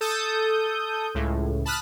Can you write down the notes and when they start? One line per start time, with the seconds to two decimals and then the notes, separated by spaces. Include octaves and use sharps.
0.01 A4 D#6 G6
1.15 C#2 A2
1.66 A5 B5 D#6 F6 F#6